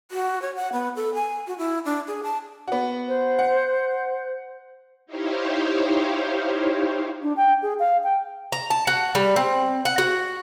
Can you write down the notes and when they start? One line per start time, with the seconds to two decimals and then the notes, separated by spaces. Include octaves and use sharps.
0.11 F#4
0.42 C#5
0.56 F#5
0.73 B3
0.96 A4
1.14 G#5
1.47 F#4
1.58 E4
1.85 D4
2.07 G#4
2.23 A5
2.68 B3 F#4
3.08 C5
3.39 F#5
5.06 D#4 E4 G4 C5 C#5 F5
7.22 D4
7.37 G5
7.62 G#4
7.79 F5
8.04 G5
8.52 A#5
8.70 A5
8.87 F#4
9.15 G3
9.36 C4
9.85 F#5
9.98 F#4